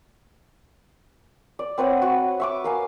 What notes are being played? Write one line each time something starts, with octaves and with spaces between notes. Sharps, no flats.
D5
C4 B4 C#5 F#5
F#4 C#6
E5 C#6 D6
A#4 F5 G#5